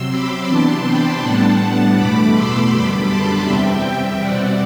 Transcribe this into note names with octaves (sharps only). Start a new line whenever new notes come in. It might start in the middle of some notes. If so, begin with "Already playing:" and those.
Already playing: C3 F#3 C4 C6 E6
B5 D6
C3 E3 B3 D4 A5 C6
G5 B5
A2 G3 B3 D4 F#5 A5
E2 B2 A3 B5 D6
C6 E6
F#2 D3 G3 B3 B5 D6
A5 C6
E2 C3 G3 C4 E5 G5
B2 G3 C4 D5 F#5